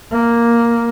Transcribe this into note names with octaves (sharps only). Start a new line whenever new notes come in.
A#3